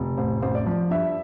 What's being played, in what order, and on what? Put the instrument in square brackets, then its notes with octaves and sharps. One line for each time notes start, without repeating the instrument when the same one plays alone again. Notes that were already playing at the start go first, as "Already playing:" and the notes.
Already playing: [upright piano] F1
A1 C5
A1 C5
D5
F3
G2 E5